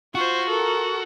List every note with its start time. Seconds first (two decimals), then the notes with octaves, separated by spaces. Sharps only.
0.15 F4 F#4 C5 C#6
0.50 A4 A#4